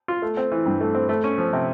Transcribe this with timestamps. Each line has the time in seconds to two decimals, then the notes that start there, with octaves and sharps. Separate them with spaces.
0.08 F4
0.22 A3
0.37 C4
0.52 E3
0.66 G2
0.81 A3
0.95 C4
1.09 A3
1.24 C#4
1.38 F3
1.53 C3